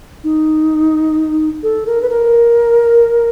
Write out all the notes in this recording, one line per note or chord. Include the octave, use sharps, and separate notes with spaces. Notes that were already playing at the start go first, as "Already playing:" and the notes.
D#4
A4
A#4
B4
A#4